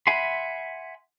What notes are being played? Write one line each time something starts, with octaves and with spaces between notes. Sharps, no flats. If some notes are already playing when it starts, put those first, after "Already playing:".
E5 F#5 G#5 B5 C6